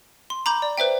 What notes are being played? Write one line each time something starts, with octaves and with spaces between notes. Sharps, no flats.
C6
A#5 B5 D6 G6
D5
B4 C5 E5 G5